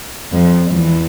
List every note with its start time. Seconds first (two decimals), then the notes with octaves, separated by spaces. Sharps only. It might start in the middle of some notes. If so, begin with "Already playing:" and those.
0.32 F2 F3
0.71 E2 E3